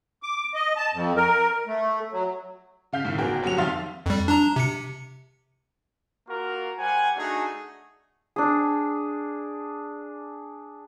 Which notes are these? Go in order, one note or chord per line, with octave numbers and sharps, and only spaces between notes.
D6
D#5
A5
F2
A#4
A3
F#3
C#3 F5 G6 B6
A2 D#3
G1 F#4 G#4 A#4 G5
F#1 F#3 G3 F#5 F7
F2 D#3 E5 F5 C6 A6
F2 G3
D4 A#5
C3 C#7
A#3 F4 F#4 A#4
G3 C5 F#5 G#5
A3 D4 D#4 F#4 G#4
D4 G#4